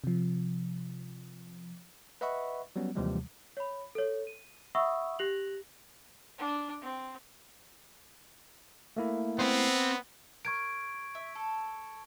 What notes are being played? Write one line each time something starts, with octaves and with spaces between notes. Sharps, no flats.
C3 F3
B4 D#5 E5 F#5 B5 C#6
F#3 G3 B3 C#4
D#2 C3 E3 F3 G3 G#3
C#5 B5
A4 C#5
D#7
E5 F#5 B5 C#6 D#6 E6
G4 F#6 A#6 F7 F#7
D4
C4
A3 A#3 E4
B3 C4 C5
A#4 C#6 G#6 D7
E5
A4